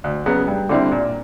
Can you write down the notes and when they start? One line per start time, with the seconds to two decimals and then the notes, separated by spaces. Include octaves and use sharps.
0.04 D2
0.26 C#3 F#3 B3
0.48 G2
0.69 D3 G3 C4 E4
0.91 A#2